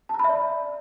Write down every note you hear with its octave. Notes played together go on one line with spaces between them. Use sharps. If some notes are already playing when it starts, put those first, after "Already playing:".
A5
A#5
B5
E5
D5